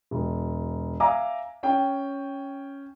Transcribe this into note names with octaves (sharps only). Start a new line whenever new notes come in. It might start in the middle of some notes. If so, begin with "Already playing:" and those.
E1
E5 F5 G#5 A#5 D6
C#4 G5